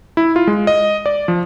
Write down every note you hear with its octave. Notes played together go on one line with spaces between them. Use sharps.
E4
F4
G#3
D#5
D5
F3